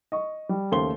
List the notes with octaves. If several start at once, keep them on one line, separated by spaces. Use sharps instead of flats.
D#5 C#6
G3
D#2 C#3 A3 C5 C6 G7